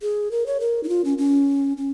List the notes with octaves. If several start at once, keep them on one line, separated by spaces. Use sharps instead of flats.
G#4
A#4
C#5
A#4
D#4
F4
C#4
C#4
C#4